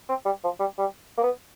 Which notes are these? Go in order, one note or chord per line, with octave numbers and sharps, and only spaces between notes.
C4
G3
F3
G3
G3
A#3
B3